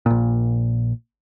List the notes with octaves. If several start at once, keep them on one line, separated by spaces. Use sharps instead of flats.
A#1 A#2